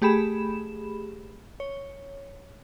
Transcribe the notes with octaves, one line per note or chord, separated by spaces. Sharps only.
A3 G4 G#4 B5 E7
C#5